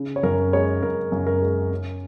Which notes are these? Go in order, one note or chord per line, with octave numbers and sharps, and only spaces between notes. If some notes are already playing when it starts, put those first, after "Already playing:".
Already playing: C#3
C#5
F#2 A#4
G#3 C#5
F#2 A#4
F#2
A#4
G#3
C#4